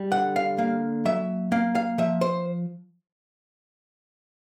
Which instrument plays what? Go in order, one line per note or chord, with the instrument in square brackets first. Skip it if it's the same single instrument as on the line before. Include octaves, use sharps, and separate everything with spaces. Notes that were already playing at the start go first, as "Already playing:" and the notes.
Already playing: [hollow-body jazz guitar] G3
D3 F#5
F5
A#3 F5
F#3 E5
A#3 F5
F5
F3 E5
C5